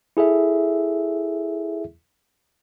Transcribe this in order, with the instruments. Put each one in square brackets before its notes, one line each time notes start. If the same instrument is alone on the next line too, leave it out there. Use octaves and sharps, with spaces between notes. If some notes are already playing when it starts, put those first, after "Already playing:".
[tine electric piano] E4 G#4 A4 E5